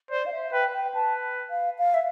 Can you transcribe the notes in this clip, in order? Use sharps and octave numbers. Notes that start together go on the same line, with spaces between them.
C5 D5
F5
E5
B4 G5
G5
B4 A5
F5
F5
E5